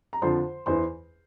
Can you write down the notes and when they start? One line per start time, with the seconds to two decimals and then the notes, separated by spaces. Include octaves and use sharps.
0.13 A#5
0.22 F2 D3 F3 C5 C6
0.66 E2 E3 C5 C6